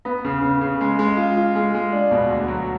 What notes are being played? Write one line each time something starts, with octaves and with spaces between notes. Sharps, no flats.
B3
C#3
C#3
C#3
G#3
G#3
F4
F4
G#3
G#3
D4
B2
D2
F#3